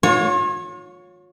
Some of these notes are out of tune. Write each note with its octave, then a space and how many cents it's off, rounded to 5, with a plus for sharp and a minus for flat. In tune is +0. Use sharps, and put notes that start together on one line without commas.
F4 +45 C#5 +0